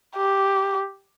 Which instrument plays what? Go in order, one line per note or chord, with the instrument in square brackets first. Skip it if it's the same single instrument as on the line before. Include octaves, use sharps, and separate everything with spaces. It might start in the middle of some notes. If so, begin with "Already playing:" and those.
[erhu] G4